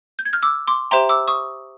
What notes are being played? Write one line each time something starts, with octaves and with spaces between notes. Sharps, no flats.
G6
G#6
F6 G6
D6 E6
C6 D6
G4 C5 E5 G5 A#5 C6
D6 E6
C#6 D#6